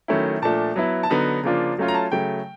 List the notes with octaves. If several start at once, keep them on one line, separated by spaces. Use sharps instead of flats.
D#3 F#3 A3 C#4 E4
A#2 F3 A3 D4 A5
F#3 B3 E4
A5
D3 F#3 B3 D#4 A#5
C#3 F3 A#3 D4 F4
F#3 A3 C#4 F4
A#5
A5
C#3 F#3 A3 G5